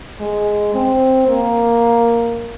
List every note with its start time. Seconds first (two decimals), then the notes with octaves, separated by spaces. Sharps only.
0.20 G#3
0.74 C4
1.28 A#3